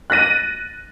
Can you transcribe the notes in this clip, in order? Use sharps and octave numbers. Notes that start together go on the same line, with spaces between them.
F#6 A6 A#6 D#7